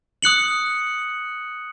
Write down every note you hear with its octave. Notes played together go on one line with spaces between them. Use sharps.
D#6 F#6 C#7 F#7